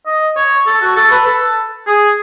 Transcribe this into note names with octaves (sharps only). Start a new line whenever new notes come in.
D#5
C#5
A4
F#4
A4
B4
A4
G#4